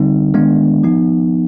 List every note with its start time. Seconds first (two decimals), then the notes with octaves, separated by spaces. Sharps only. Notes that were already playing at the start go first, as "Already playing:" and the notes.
Already playing: D3 G3 C4 D#4
0.34 D#3 G#3 B3 D4
0.83 F3 B3 D#4